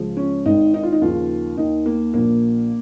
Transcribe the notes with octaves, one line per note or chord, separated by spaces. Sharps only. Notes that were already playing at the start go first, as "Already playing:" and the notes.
Already playing: C#2 C#3 F3
C#4
G#1 G#2 D#3 D#4
D#4
F4
D#4
D#2 C#3 F3 F4
D#2 D#3 D#4
A#3
A#1 A#2 F3 A#3